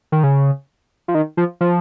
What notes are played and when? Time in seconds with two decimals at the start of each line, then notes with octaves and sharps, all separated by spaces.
0.12 D#3
0.23 C#3
1.08 F3
1.15 D#3
1.37 F3
1.61 F3